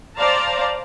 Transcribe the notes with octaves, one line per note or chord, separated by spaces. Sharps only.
C5 D5 F5 A5 A#5